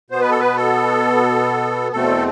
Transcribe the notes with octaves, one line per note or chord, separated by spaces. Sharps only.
B2 B3 C5
B4
A4
B4
A4
E2 B2 A3 C4 A4